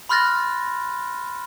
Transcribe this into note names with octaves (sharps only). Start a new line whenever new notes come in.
B5 C6 F6 F#6 A6 A#6